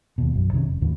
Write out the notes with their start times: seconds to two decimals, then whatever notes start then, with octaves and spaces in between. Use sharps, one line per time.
0.18 D#2 B2
0.34 B1 F#2
0.53 C3 D#3 G3 C#4
0.68 F1
0.81 D#2 A2 D3 E3